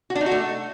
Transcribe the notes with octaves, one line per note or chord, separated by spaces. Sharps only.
F#4
D4
D#4
F#4
A3